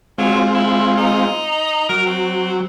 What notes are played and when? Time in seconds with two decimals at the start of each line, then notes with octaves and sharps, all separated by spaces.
0.18 F#3 G#3 C4 F4
0.54 E4
0.98 D#4
1.89 F#3 A#4
2.06 C4